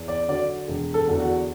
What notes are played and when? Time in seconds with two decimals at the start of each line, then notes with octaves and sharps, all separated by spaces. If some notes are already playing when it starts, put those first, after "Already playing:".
Already playing: E2
0.08 D5
0.29 D3 F#3 D5
0.68 E1
0.94 A4
1.07 E2 D3 F#3
1.20 F#4